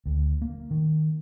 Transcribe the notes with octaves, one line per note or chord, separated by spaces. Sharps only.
D2
A#3
D#3